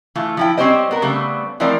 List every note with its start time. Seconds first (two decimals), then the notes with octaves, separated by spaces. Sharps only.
0.15 E3 A3 F4
0.37 F3 E4 G5
0.58 G3 C4 C#4 G4 C5 D#5
0.91 B3 A#4
1.02 C#3 G3 A3 B3 C4
1.60 E3 F3 A3 C4 A#4 D5